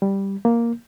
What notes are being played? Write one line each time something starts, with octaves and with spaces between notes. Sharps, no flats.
G3
A#3